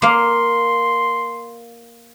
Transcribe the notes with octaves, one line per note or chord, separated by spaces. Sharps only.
A#3 F5 C6